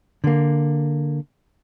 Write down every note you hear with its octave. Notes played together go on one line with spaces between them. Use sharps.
D3 A#3